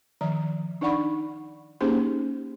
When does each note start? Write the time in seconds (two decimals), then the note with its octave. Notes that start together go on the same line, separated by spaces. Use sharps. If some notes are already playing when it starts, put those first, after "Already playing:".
0.21 D#3 F3 A#5
0.81 D4 D#4 D5 F#5 B5 C#6
1.81 A#3 C#4 D#4 G4 G#4 C5